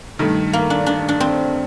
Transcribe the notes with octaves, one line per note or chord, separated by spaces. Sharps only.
G2 D#3 A3
A#3
D4
D4
D4
C4